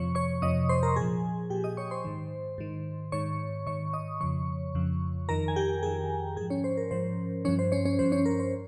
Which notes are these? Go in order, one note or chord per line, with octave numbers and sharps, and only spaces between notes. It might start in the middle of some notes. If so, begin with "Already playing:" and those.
Already playing: F2 C3 F3 C#5 C#6
C#5 C#6
F2 C3 F3 D#5 D#6
C5 C6
A#4 A#5
A#2 F3 G#4 G#5
A#2 F3 G4 G5
D#5 D#6
C#5 C#6
C5 C6
G#2 D#3
G#2 D#3
G#2 D#3 C#5 C#6
G#2 D#3 C#5 C#6
D#5 D#6
F2 C#3 F3 C#5 C#6
F2 C#3 F3
F2 D#3 A#4 A#5
G#5
G4 G5
F2 D#3 G#4 G#5
G#2 F3 G#4 G#5
C#4 C#5
C5
A#4
G#2 F3 C5
G2 F3 C#4 C#5
C5
C#4 C#5
C#4 C#5
G2 F3 C5
C#4 C#5
A#4
C5